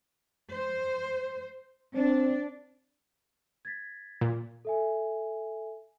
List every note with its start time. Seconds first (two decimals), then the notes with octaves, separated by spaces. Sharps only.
0.49 C5
1.95 C4 D4
3.65 G#6 A6 B6
4.21 A#2
4.65 A4 E5 G#5